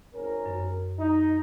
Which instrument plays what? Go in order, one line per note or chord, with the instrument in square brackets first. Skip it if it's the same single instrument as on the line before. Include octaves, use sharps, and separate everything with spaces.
[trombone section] G#1 C#4 A#4
[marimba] F#2
[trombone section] D#4